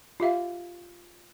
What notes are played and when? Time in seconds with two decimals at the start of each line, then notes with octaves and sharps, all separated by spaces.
0.20 F4 G4 E5 F5